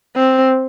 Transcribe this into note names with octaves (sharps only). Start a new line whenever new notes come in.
C4